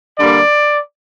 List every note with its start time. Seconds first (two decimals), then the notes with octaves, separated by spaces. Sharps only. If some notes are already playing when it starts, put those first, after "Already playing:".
0.17 D3 G3 A#3 D5